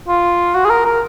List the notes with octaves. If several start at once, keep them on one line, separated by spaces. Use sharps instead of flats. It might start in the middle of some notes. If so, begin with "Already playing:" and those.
F4
F#4
G#4
A#4
A#4